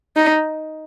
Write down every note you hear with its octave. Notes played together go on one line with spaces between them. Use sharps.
D#4